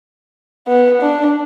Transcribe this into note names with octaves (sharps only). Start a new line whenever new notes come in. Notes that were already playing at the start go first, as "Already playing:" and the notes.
B3
D4